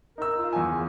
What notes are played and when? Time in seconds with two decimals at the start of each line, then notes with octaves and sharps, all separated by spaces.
0.18 D#4 A#4 E6
0.38 F4
0.53 E2 G#5
0.71 C#3